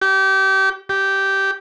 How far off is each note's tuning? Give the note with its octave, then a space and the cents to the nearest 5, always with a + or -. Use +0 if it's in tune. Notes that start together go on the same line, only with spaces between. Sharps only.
G4 -30
G4 -10